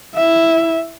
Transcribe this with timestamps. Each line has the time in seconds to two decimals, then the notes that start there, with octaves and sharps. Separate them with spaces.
0.15 E4 E5